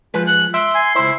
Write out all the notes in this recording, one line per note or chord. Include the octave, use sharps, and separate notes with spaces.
F3 G#3 B4
F#6 F#7
E5 C6 D7
G#5 C7
C#2 E4 C5